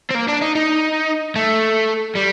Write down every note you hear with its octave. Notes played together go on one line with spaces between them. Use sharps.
C4
A#3
D4
D#4
D#4
A3
G3